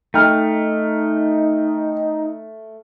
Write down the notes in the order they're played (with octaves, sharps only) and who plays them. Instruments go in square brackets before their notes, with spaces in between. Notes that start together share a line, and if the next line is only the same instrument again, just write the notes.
[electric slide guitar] A3 [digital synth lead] D#4 [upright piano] G5 F6